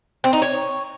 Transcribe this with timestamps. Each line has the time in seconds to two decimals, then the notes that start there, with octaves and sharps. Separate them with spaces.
0.24 C4
0.33 D#4
0.42 C#5